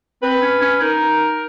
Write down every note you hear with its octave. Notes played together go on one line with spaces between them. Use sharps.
C4 B4
C#4
C#4
D#4 A#4